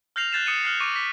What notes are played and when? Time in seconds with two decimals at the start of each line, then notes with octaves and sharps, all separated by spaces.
0.16 F6 G6 A#6 C7 F7
0.32 F#6 G6 A6 C7 E7
0.46 D#6 C#7 D#7 E7
0.63 F6 F#6 C7 E7
0.80 C#6 D6 A#6 D#7
0.96 B6